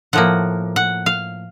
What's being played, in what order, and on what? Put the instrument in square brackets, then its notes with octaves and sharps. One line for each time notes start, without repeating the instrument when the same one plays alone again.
[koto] A2 F3 A#3 F#5
F#5
F5